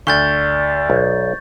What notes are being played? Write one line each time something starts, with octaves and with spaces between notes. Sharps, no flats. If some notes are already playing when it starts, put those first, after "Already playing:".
D2 D5 C#6 G6 A6
B1